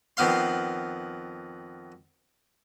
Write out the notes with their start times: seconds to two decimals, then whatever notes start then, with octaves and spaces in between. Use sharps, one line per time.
0.17 F2 D#3 B3 F5 C6